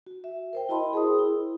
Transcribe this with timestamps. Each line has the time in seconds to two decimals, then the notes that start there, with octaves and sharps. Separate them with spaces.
0.06 F#4
0.24 E5
0.53 A#4 C5 G5
0.69 E4 F#4 D#5 A5 B5 C6
0.93 G#4 A#4 C5 C6 D#6
1.19 E4